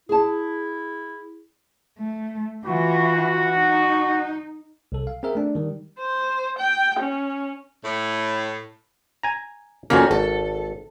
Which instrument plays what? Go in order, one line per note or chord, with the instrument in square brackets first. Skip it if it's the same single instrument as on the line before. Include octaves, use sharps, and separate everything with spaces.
[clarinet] E4 [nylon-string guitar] G#4 A5
[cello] A3
[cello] E3 F4 [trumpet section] F#4
[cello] D#4
[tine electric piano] C2 A4
F5
C4 G#4 A#4 E5
A3 D4
D#3 G3
[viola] C5
G5
C#4
[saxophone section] A2
[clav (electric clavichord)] G#5 A#5
[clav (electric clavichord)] F2 A#3 [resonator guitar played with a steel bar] D#3 C#4 F#4
[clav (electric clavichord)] G#1 [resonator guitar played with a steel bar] A4